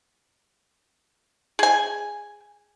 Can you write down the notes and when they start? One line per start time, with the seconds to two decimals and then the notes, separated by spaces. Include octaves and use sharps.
1.59 G#4 G#5